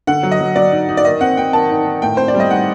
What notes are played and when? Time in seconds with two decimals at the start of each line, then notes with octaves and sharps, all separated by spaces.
0.07 D3 F#5
0.23 F#3
0.31 D#5
0.40 F#3
0.56 F#3 D5
0.72 D#4
0.89 D#4
0.97 D5
1.05 D#3 D#5
1.20 C4 F#5
1.37 C4 G5
1.53 D#3 A5
1.70 D#4
1.85 D#3
2.02 A2 G5
2.17 C4 C5
2.28 D5
2.34 G3
2.40 D#5
2.51 D#4 F#5